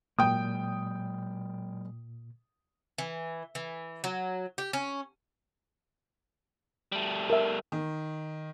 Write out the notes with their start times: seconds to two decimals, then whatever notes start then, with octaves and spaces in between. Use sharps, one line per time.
0.19 A#2 F#3 G#3 A#3 G5 D#6
2.98 E3
3.55 E3
4.04 F#3
4.58 G4
4.73 C#4
6.92 G3 A3
7.30 A#4 E5
7.72 D#3